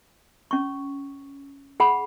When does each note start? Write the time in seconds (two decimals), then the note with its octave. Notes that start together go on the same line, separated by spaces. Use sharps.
0.51 C#4 C#6
1.80 G#4 F#5 B5